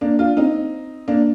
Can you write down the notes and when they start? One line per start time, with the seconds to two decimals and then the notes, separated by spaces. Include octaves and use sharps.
0.01 A#3 D4
0.19 D4 F4
0.37 C4 D#4
1.08 A#3 D4